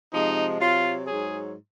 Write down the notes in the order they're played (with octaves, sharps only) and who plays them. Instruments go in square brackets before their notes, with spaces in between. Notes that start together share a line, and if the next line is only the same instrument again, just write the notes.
[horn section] C3 F3 G#3 D#4
C3 F#3 F4
G#2 F#3 G#4